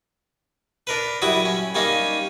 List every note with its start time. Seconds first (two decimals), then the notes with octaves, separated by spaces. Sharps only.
0.87 D4 A#4 B4
1.22 F#2 G3 E4 F#4 D#6
1.45 C#4
1.75 G3 A#3 C#4 D#4